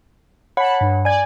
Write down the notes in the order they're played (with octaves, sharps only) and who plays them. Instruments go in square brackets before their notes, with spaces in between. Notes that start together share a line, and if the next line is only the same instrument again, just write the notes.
[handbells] C#5 F#5 [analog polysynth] A5 B5
[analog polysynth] G2
[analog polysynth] D5 [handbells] G#5 G#6